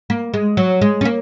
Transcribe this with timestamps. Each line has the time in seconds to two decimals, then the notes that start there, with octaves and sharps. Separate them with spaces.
0.10 A#3
0.34 G#3
0.57 F#3
0.81 G#3
1.01 C#4
1.05 A#3